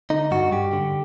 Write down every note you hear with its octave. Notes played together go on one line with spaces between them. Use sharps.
D3 D#4
G2 F#4
G2 G4
D3